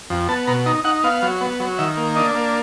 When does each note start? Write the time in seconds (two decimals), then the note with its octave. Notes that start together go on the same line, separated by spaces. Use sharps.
0.10 F2
0.29 B3 A5
0.47 B2 A#5
0.66 D#4 A#5
0.84 D#4 F#5
1.04 B3 F5
1.22 F#3
1.41 B3
1.60 F#3
1.78 D#3 E5
1.97 A#3
2.16 D4 D#5
2.35 A#3